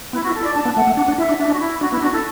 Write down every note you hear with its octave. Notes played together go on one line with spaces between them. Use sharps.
B3 E4
F#4
E4
A4
E4
D5
D4 A5
B3
A3 F#5
A3
D4 F#5
D4
E4 E5
D4
D4 E5
F#4
E4
D4 F#4
B3 E4
D4 F#4
E4 A4